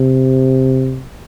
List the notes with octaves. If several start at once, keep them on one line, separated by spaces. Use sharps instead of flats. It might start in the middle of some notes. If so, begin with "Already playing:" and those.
Already playing: C3